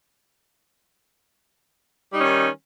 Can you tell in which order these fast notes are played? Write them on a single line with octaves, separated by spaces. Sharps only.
G3 D#4 C#4 D#3